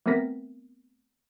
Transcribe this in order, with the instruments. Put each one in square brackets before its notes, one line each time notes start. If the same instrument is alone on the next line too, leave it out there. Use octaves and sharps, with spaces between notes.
[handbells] A3 B3 C4 A#4 A#6 B6